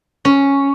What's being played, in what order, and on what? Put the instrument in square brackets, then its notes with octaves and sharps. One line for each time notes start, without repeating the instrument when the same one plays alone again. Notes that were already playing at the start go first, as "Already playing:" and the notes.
[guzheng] C#4